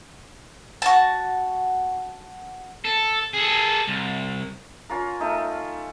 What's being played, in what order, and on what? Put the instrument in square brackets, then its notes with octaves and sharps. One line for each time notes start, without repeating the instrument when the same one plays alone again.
[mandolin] F#4 A5
[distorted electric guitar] A4
G#4 A4
C2
[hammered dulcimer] C#4 F4 A#4
A3 D#4